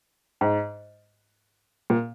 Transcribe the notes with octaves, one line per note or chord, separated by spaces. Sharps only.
G#2
A#2